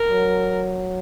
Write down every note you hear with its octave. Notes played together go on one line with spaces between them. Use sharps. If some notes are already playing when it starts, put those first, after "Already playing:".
Already playing: A#4
F#3